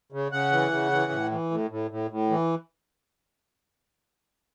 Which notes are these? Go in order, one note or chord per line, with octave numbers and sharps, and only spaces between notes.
C#3
C#3 F#5
E3
C#3
E3
A2
E3
A2
A2
A2
A2
E3